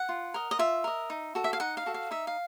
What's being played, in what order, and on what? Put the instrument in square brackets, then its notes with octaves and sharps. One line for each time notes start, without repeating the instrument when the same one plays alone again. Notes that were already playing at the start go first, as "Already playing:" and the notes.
Already playing: [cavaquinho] F#5
F4
A#4 D#5
D#5
F4 E5
A#4 D#5
D#4
F#4 A4
E5
F5
D#4 F#5
F5
F#4 A4
F5
D#4 E5
F5